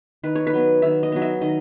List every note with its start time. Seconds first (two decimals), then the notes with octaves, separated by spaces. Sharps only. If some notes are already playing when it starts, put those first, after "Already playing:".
0.23 D#3 B4
0.35 C#5
0.47 B4
0.54 F#3 B3
0.82 D#3 E5
1.03 D#5
1.12 F#3 B3
1.22 E5
1.41 D#3 D#5